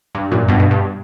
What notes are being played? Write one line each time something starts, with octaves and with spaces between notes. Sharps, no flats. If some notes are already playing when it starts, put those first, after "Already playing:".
G2
F#2 A#2
G2 B2
G2 B2
G2